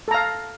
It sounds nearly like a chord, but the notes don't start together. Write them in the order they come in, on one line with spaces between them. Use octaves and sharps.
A4 A#5 F5